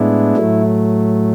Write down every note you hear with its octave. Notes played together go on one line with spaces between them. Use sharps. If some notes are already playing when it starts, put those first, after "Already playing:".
Already playing: A2 G#3 B3 D4 E4
A2 F#3 A3